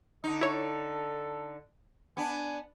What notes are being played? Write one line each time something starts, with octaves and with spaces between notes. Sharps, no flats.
D3 D#4 D#5
E4 A4 C#5
B3 D4 G#5